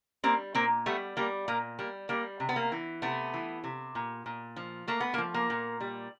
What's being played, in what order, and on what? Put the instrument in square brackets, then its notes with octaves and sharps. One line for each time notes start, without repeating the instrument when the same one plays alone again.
[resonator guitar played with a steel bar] G3 A#3 C4
A#2 A#3 C4
G3 A3 B3
G3 A#3
A#2 A#3
G3 A#3
G3 A#3
C3
B3
A#3
E3
C3 A3 B3
E3
C3
A#2
A#2
F3
A3 A#3
B3
A#3
F3
A#3
A#2
G3